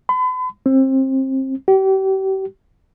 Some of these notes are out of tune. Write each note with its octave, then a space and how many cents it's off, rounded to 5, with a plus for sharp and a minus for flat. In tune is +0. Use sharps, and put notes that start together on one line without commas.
B5 +40
C4 +25
G4 -35